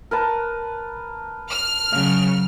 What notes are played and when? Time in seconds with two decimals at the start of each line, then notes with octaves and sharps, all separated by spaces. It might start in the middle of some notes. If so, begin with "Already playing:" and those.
0.11 A#4 B4 A5
1.50 F6
1.92 C#3 F#3 F5